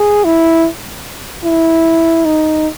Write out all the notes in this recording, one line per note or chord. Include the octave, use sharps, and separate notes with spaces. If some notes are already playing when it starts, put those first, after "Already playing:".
Already playing: G#4
E4
E4
D#4